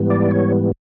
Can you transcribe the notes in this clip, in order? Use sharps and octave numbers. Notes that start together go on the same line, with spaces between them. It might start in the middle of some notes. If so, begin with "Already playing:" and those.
Already playing: G#2 E3 G3 B3
D5
C#5